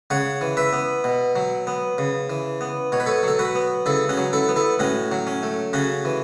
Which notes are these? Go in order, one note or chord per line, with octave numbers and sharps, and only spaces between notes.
C#3 C#5 F#5
E3
B4 E5
B3
B2
F#3
B3
C#3
E3
B3
B2 C#5
B4
A4 C#5
F#3 A4
F#4 B4
B3
C#3 E4 A4
C#4 F#4
F#3
E4 A4
B3
E4 A4
A2 C#4 F#4
F#3
C#4
A3
C#3 C#4 F#4
E3